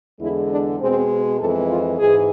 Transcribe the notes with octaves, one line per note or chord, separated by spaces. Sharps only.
E2 D3 G#3 E4
D4
B2 G#3 C4
F2 E3 G#3 A4
F4
G#2 E3 G#3 G#4